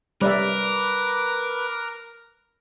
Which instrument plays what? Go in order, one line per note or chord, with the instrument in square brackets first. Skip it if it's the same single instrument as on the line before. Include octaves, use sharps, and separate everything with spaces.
[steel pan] G3 D5 E5 [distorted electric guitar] A#4 [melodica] B4 D6